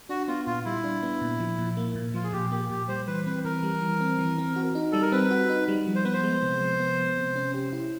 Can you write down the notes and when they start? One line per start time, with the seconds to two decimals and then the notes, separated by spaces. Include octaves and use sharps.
0.09 D4 F#4
0.28 B3 F4
0.46 A#2 F4
0.65 G3 E4
0.84 D4
1.03 B3
1.21 A#2
1.40 F3
1.58 A#2
1.77 A#3
1.96 A#2
2.14 F3 F4
2.24 G#4
2.33 A#2 G4
2.51 A#3 G4
2.70 A#2 G4
2.88 G3 C5
3.07 E3 B4
3.26 C4 B4
3.44 E3 A#4
3.63 G3
3.81 E3
4.01 C4
4.19 E3
4.38 C4
4.56 F#4
4.75 D#4
4.92 G3 A4
5.02 A#4
5.12 C4 B4
5.31 F#4
5.50 D#4
5.68 G3
5.87 F3
5.96 C5
6.04 B3 B4
6.13 C5
6.23 G#3
6.43 C3
6.61 F3
6.80 B3
6.99 G#3
7.17 C3
7.36 C#4
7.54 G4
7.73 E4